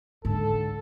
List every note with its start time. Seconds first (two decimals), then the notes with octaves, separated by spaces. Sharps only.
0.25 G#2 D3 A4